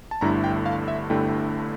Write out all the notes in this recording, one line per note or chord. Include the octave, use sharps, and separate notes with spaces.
A5
G1 G2 D3 A3 E4 A#5
G5
F5
E5
G1 G2 D3 A3 E4 G5